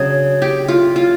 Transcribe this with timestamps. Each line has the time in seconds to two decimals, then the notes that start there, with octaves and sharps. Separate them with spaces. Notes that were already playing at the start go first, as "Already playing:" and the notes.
Already playing: C#3 F#3 D4 G#4
0.42 G4
0.68 F4
0.96 F4